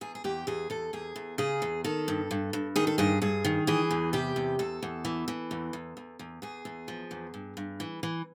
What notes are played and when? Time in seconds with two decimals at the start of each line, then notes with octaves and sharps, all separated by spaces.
0.01 E2 G#4
0.15 G#4
0.24 E2 G4
0.47 E2 G#4
0.70 E2 A4
0.93 E2 G#4
1.16 E2
1.38 C#3 G#4
1.62 E2
1.84 D#3 A4
2.08 G2
2.31 G2
2.53 G2
2.76 D#3 G#4
2.87 A4
2.98 G2 G#4
3.22 G2 G#4
3.45 D#3
3.67 E3 G#4
3.91 E2
4.13 C3 G4
4.36 E2
4.59 E2 A4
4.83 E2
5.05 E3
5.28 E3
5.51 E2
5.73 E2
5.97 E2
6.19 E2
6.42 E2 G#4
6.65 E2
6.88 F3
7.11 E2
7.34 G2
7.57 G2
7.80 E3
8.03 E3